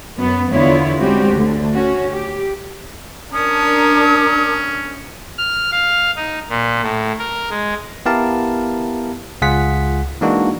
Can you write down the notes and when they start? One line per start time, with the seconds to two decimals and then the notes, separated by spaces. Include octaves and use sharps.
0.16 F#2 B3
0.49 E2 D3 B3 E4 F4 C#5
0.99 G3 G#3 C4 C#4 F#4 G4
1.32 D2 D3 A3
1.72 C#4 F#4
2.09 G4
3.33 C#4 D4 A#4 D#6
5.38 F6
5.72 F5
6.16 D#4
6.50 A#2
6.83 A2
7.18 A#4
7.50 G#3
8.06 B3 E4 G4 A#4 F5 A5
9.42 C#2 F4 G#4 F#5 B6
10.21 E3 G#3 A#3 D4 D#4 F#4